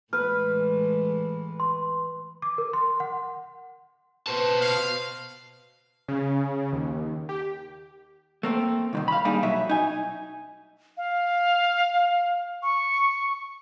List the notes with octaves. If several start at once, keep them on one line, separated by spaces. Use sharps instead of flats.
A2 E3 G#3 B4 B5 F6
C6
D6
A#4
C6
F#5
B2 B4 C5 A5
F5
C#3
D#2
G4
A3 A#3 C4
C2 D3 D#3
F5 B5
G3 A#3 D4 D#4 G#4
B1 F#3 E5
D#4 G#5
F5
C#6